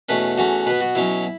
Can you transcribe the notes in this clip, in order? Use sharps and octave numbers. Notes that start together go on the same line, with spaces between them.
E2 B2 A3 C#4 B4
E2 E3 A3 C#4 F#4
B2 B3 B4
F#4
B2 F#3 C#4 E4